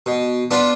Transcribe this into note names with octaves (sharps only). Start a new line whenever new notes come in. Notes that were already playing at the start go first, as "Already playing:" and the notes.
B2
B3 D4 F4